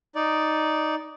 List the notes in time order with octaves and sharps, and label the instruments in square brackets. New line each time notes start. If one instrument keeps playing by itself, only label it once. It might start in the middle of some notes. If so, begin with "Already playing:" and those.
[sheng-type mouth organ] D#4 D5